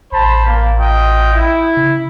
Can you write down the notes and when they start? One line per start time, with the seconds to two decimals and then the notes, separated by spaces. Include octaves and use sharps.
0.12 A1 C5 A5 B5
0.47 A#3
0.78 F4 D#5 G5
1.33 E4
1.77 C#3